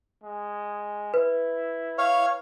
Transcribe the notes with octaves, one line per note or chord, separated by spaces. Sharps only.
G#3
E4 B4
C#5 F5